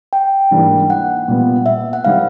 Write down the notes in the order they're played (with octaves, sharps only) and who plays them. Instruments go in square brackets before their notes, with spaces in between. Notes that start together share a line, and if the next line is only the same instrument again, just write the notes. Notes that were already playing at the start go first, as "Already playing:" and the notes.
[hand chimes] G5
[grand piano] G#2 E3 G3 A#3 D4
[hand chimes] F#5
[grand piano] A#2 G3 B3
[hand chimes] E5
F#5
[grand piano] D#3 G3 C4 [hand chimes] F5